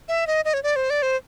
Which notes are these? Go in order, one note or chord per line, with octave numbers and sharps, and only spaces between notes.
E5
D#5
D#5
C#5
D5
C5
D5
C5